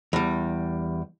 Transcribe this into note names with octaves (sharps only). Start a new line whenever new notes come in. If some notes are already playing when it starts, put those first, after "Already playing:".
E2 G3